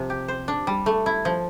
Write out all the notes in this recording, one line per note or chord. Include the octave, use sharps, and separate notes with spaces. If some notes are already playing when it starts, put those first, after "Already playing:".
Already playing: C3 F3
G4
C5
D4
G3
A3
E4
F3